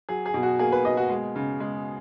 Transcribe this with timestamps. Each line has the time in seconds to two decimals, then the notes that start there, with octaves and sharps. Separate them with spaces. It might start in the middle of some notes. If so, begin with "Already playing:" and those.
0.09 F#3 G#4
0.26 G#4
0.34 B2
0.43 F#4
0.59 A#3 G#4
0.72 B4
0.85 B2 D#5
0.97 F#4
1.10 G#3
1.36 C#3
1.60 G#3